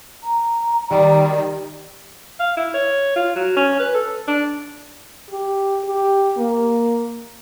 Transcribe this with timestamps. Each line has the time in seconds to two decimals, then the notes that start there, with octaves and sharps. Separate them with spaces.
0.24 A#5
0.91 D#3 G3
2.40 F5
2.57 E4
2.74 C#5
3.16 F4
3.36 F#3
3.57 C#4
3.80 B4
3.94 A4
4.28 D4
5.31 G4
5.85 G4
6.38 A#3